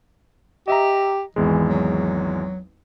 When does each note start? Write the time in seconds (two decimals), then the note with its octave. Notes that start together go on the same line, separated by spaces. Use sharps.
0.68 G4 D#5 E5 A#5
1.36 G#1 E2 E3 G#3
1.68 F#3